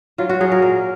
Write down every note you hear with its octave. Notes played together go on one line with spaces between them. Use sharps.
F#3 F4
F#4
F#3 G#4
A#4
A#2 A#4